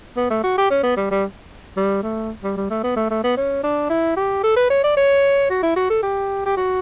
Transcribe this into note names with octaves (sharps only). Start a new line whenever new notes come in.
B3
A3
F#4
G4
C#4
B3
G3
G3
G3
A3
G3
G3
A3
B3
A3
A3
B3
C#4
D4
E4
G4
A4
B4
C#5
D5
C#5
F#4
E4
F#4
A4
G4
G4
F#4